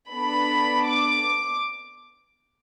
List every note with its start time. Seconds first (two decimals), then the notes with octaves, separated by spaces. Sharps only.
0.12 B3 D4 A4 B5
0.88 D6